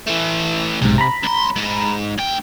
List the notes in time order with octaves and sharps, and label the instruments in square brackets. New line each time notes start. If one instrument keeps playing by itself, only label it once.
[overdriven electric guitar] E3 A3
[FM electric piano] B1 G#2 [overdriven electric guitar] C3
[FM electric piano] A#5 B5
[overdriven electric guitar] C#2 C6
G#3 D#4
D2 G5